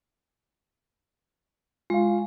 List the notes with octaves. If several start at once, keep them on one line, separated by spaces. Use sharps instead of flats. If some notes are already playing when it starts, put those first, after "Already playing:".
G#3 F4 F5